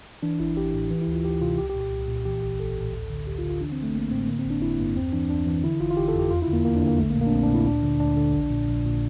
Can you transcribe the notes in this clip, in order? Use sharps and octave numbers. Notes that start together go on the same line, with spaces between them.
E3 D4
A1 E4
A1 G4
A2
E3
E4
D2
F4
D2 G4
C3 F4
C2 G4
G4
A#2
G4
C2
A#2
E3 G4
A1 G4
A1 A4
A2
D2
D3
D2 G4
F4
D3
F4
E3 D4
C4
A1
A3
A1 A#3
A2 C4
D3 A#3
C4
G1
D4
G1 E4
G2 A#3
E2 C4
E3 D4
E2 D4
E3
D3 E4
G1 F4
F4
G1 G4
A4
F2
G4
E2 F4
E4
D3
A#3
E2 A#3
D4
D3
A#3
A#1 A3
A#3
A#2
A#3
D4
A#1 C4
D4
A#2
E4
D2 D4
D3
D2 D4
D3
A#1
A#2
A#1
A#2